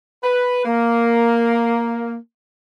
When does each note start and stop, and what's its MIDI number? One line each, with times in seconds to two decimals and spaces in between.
0.24 0.61 71
0.65 2.16 58